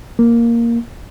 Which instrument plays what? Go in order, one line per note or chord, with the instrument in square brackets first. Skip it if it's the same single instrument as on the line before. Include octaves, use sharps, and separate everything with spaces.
[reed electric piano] A#3